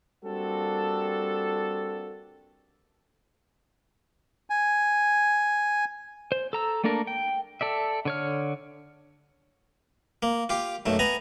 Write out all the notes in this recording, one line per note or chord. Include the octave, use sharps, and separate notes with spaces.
G3 A#3 C4 D4 F#4 A4
G#5
C5
A4 A#5 E6
A3 A#3 D4 A4 A#4
G5
A4 D5 E5
D3 C#5 F6
A#3
F4 G4
B1 F#2 A3
B3 G#5 A#5